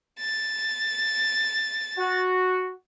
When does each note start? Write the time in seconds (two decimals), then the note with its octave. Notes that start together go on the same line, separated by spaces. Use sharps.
0.20 A6
1.97 F#4